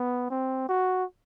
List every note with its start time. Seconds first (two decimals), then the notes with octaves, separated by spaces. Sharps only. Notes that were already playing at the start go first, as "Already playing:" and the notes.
Already playing: B3
0.30 C4
0.69 F#4